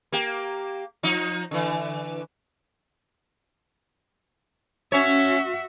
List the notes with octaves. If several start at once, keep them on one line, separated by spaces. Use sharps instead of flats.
A#3 G4
F3 D#4
D3 E3
C#4 F#4 C#5 E5